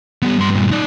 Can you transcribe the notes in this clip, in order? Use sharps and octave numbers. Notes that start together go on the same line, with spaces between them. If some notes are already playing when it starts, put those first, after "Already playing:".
G3 B3
G2 C6
G2 A#2
D#4 D5